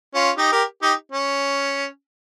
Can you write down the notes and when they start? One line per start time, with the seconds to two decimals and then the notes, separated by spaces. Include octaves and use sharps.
0.15 C#4 F4
0.37 D#4 G4
0.52 G4 A#4
0.82 D#4 G4
1.12 C#4